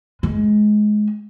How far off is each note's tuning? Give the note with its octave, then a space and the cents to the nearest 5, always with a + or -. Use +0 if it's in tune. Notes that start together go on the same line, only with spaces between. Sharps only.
G#3 +20